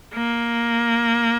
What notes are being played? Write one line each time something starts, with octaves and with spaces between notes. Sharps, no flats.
A#3